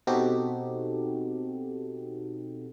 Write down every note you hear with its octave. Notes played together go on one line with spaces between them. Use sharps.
B2 C4 D#4 F#4 G4 A4